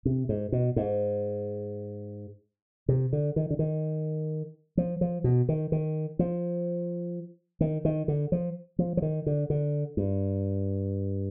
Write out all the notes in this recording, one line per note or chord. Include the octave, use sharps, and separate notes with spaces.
C3
G#2
B2
G#2
C3
D3
D#3
D3
D#3
F3
F3
B2
D#3
D#3
F3
D#3
D#3
D3
F3
F3
F3
D#3
D3
D3
G2